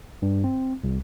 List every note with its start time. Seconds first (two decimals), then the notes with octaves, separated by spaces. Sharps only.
0.22 G2
0.44 C4
0.84 C2